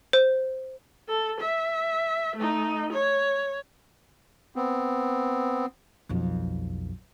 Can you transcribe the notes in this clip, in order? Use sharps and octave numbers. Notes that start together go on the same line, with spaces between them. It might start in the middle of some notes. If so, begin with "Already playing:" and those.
C5
A4
E5
A3 D#4
C#5
B3 C4
B1 F2